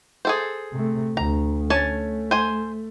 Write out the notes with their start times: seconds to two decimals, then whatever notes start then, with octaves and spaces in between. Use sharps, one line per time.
0.25 G#4 A4 C5
0.73 C3 A3
1.17 D2 A#5
1.70 A3 C#4 G#5 A5
2.31 C5 G#5